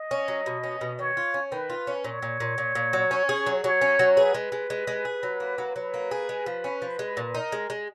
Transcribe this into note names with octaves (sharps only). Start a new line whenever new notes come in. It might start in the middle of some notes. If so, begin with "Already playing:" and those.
Already playing: D#5
C#4
F#3
B2
C#4
B2
D#3 C#5
F4
C#4
D#3 B4
F4
C#4
A#2 C#5
A#2
A#2
A#2
A#2
F#3
C#4
G#4
F#3
F#3 C#5
C#4
F#3
G#4 B4
G#3
G#3
G#3
G#3
G#4
F#3
A#3
F#3
F#3 B4
A#3
G#4
G#3
F3
C#4
F3
G#3
A#2
D#4 A#4
G#3
G#3